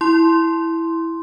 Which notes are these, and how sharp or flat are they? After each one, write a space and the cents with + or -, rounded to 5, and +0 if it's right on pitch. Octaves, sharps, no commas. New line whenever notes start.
E4 +0 C6 +0